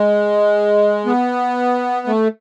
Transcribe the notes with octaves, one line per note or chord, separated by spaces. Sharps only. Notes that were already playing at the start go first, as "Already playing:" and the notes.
Already playing: G#3
B3
A3